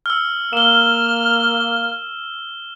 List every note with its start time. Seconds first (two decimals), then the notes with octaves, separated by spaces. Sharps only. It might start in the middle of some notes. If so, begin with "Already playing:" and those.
0.06 E6 F6
0.53 A#3 F6 E7 G7